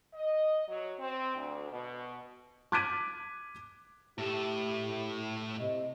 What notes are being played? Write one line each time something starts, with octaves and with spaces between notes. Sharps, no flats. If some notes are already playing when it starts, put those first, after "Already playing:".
D#5
F#3
C4
D2
B2
D6 F#6 G#6 B6 D7 D#7
A2 E4 G4 A4
C3 D#5